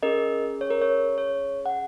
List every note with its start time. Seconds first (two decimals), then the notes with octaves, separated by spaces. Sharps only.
0.03 C#4 G#4 A#4 D#5
0.61 C#5
0.70 A#4
0.82 C#5
1.18 C#5
1.66 F#5